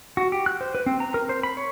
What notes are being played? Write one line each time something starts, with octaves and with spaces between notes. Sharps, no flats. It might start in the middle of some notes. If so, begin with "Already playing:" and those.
F#4
G4
F#6
C5
B4
C4
A#5
A#4
C5
B5
C#5